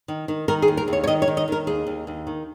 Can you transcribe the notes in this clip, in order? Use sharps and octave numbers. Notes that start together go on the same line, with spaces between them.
D#3
D#3
D#3 A#4
G#4
D#2
A#4
D#2
C#5
C#5
D#3 D#5
C#5
D#3
D#5
D#3 A#4
D#2 G#4
D#2
D#2
D#3